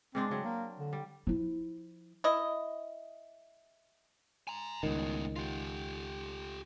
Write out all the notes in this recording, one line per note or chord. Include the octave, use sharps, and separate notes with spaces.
G#2 G#3 C4 D4
C#3 F#3 C4
A#3
D3
G3
F3 E4
E4 D#5
G#5 A#5
C#2 A2 D#3 B3
F4 G4